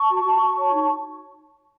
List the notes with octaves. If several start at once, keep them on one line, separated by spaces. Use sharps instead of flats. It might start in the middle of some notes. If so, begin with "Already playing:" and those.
Already playing: A5 C#6
F#4
F#4
F#4
C#5
D#4